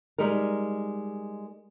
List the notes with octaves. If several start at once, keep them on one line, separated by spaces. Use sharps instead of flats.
G3 G#3 D#4 A#4